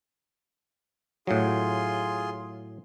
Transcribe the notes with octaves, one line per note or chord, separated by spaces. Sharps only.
A2 F#3 F4 G#4 C6